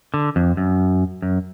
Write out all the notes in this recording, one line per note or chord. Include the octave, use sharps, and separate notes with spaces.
D3
F2
F#2
F#2